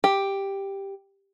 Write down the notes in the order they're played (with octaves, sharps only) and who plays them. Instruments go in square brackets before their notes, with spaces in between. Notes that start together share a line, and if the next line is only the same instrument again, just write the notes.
[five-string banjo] G4